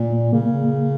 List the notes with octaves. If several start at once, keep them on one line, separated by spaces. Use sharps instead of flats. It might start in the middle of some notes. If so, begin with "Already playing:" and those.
Already playing: A#2 A#3
C#3 A#3